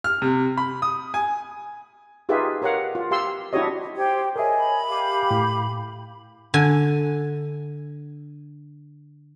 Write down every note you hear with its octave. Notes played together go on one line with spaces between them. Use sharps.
F6
C3
B5
D#6
G#5
D#4 F4 G4 G#4 B4 E5
G4 A#4 C#5 F5 F#5
F4
G4 F5 C6 E6
D4 E4 F#4 G4 C#5 D#5
G4 C5 G5 G#6
G#4 A#4 C#5 D#5 E5 G#5
B5
G4 F5 D6
A2
D3 G#5